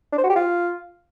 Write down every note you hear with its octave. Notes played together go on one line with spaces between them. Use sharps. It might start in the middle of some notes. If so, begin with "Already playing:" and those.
D4
C5
F#4
G4
F4